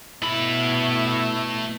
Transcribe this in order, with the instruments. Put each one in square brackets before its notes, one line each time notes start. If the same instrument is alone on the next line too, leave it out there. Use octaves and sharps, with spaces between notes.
[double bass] B2 [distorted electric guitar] A3 B5 [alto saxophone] E4